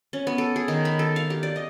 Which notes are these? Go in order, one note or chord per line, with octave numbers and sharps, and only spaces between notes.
C#4
B3
A4
G#4
D#3
B5
A4
F5
G4
D5
D#5